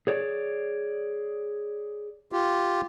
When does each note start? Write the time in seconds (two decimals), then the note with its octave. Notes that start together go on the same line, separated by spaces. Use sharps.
0.07 G#4 C#5 D5
2.32 F4 G4